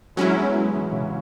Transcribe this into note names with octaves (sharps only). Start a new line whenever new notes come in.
F#3 G#3 C#4 E4
B3
G#3
E3
C#3